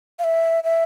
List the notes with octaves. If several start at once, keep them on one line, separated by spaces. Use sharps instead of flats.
F5
E5
E5